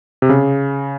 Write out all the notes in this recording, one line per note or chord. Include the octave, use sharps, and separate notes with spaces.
C3
C#3